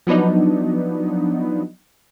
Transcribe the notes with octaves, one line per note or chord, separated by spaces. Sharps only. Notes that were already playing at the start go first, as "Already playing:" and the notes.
F3 F#3 B3 D4 D#4